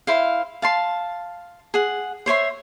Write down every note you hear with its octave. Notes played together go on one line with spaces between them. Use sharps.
E4 C5 F5
F5 A5 C6
G#4 F#5
C5 C#5 E5 C6